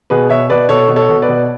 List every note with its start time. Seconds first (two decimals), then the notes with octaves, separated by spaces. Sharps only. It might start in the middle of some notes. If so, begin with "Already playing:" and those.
0.10 B2 G#4 B4
0.29 B2 C#5 E5
0.50 B2 B4 D5
0.69 B2 A4 C#5
0.89 B2
0.96 A4 C#5
1.09 B2
1.22 B4 D5
1.29 B2